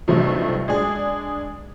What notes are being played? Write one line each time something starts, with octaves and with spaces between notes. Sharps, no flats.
B1 G2 C3 F3 A3
G#3 D4 G#4